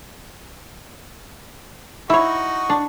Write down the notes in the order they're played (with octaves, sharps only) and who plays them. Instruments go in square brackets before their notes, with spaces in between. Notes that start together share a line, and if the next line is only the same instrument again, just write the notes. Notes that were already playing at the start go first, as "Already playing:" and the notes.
[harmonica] D#4 F#4 C#6 [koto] E4 C#5
[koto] D4